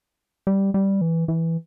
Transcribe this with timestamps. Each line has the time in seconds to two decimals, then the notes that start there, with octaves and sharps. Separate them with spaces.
0.47 G3
0.74 G3
1.01 E3
1.28 E3